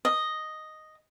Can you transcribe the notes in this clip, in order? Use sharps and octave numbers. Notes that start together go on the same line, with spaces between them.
D#5